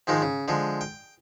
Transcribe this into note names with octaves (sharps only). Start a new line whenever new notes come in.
G#2 D#3 F3 G#3 A#3
C#3
D3 F3 G#3
G5